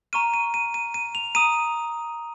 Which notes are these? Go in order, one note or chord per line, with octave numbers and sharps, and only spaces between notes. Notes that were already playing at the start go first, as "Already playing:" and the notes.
A#5 C#6 F6 D#7
D#7
D#7
D#7
D#7
F7
A#5 D#6 D#7